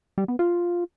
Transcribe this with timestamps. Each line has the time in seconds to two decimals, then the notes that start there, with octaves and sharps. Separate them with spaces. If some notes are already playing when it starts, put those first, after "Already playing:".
0.18 G3
0.28 B3
0.39 F4